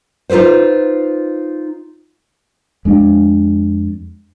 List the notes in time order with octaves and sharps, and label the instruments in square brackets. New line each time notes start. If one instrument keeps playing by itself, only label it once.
[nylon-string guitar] D#4 F4 A4 B4 C5
[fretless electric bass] F2 G#3 D4